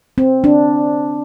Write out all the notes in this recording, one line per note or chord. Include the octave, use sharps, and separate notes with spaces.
C4
D4